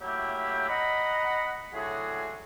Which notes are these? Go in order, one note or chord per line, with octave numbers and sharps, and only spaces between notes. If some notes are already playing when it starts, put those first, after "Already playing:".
F#3 A3 A#3 E4 G4
D#5 F#5 A#5 B5
A2 D3 F#3 F#4 G#4